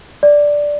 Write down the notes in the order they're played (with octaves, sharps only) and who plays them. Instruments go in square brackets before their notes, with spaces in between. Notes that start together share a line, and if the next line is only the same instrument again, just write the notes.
[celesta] D5